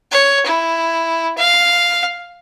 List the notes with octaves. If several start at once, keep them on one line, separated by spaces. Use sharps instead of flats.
C#5
E4
F5